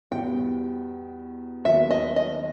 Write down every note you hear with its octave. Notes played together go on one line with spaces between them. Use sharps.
E2 B2 G3 G5
D#2 D#3 F#3 B3 E5
D#5
D#5